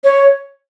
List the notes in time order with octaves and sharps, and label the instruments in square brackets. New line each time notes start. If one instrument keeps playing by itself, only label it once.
[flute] C#5